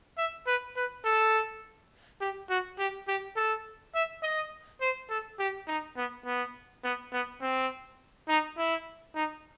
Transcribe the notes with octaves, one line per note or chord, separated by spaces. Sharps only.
E5
B4
B4
A4
G4
F#4
G4
G4
A4
E5
D#5
C5
A4
G4
D#4
B3
B3
B3
B3
C4
D#4
E4
D#4